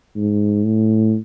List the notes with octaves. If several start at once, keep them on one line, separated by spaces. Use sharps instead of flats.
G#2
A2